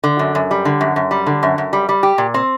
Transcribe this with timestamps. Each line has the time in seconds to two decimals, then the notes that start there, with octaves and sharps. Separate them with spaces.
0.04 D3
0.19 F#2
0.35 F#2
0.51 G3
0.65 D3
0.81 F#2
0.96 F#2
1.11 G3
1.27 D3
1.43 F#2
1.58 F#2
1.73 G3
1.89 G3
2.03 G4
2.18 A#2
2.34 C4